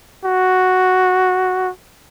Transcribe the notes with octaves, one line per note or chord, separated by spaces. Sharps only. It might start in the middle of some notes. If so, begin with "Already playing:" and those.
F#4